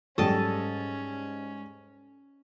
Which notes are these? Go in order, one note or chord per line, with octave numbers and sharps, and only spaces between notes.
G#2 F#3 G3 C#4 A4 D#5 G5 A5